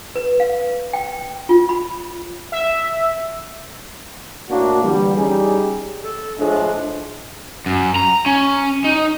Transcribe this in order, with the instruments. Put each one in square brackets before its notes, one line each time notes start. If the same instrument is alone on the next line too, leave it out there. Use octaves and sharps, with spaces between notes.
[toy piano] B4
F5
G5
F4
B5
[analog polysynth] E5
[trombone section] A2 A#3 D4 F#4
D3 E3 G3
G3 C#4 D#4 G4 G#4
[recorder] A4
[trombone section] A2 F3 G#3 [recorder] D4
[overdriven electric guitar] F#2
A#5
C#4
D#4